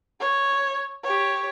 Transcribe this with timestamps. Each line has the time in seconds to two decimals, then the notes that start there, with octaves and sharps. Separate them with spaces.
0.20 C#5
1.04 G4 C#5